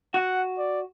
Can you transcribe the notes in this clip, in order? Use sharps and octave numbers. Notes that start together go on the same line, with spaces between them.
F#4 F#5
D5